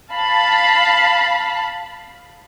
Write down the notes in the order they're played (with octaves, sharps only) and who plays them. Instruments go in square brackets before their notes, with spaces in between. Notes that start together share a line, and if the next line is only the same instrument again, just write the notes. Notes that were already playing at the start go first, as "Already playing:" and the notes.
[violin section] F5 A5 B5